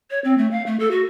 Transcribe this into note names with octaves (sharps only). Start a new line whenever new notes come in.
C#5
C4
A3
F5
A3
A4
F#4